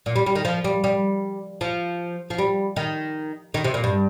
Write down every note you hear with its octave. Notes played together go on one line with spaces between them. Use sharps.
A#2
G3
G3
D#3
F3
G3
G3
F3
F3
G3
D#3
D#3
C3
A#2
G2